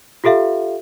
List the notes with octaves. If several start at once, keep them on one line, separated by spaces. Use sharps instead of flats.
F4 G4 A4 E5 F5